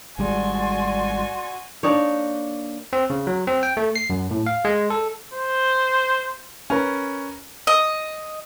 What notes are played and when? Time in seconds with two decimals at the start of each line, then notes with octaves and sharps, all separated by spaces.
0.18 G#1 G3 G#3 F#4 D5 G#5 C6
1.83 A#3 D4 D#4 C#5
2.93 C4
3.10 C#3
3.27 F#3
3.47 C4
3.63 G5
3.77 A3
3.96 C7
4.10 F#2
4.31 A2
4.46 F5
4.65 G#3
4.90 A4
5.33 C5
6.70 C#4 A#4 B4
7.67 D#5